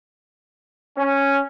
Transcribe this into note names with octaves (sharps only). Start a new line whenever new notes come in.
C#4